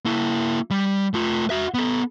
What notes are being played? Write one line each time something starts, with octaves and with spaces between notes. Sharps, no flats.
A#3 E4
G3
A3 F4
F#4 E5
B3 A4